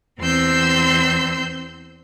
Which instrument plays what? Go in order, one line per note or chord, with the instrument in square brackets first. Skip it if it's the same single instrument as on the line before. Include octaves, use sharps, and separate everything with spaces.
[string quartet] E2 C4 C6 E6 G6